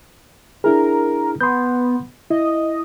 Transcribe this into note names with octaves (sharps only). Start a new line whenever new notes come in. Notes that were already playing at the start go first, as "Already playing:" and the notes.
D4 E4 G#4 A#4
B3 C6 G6
E4 D#5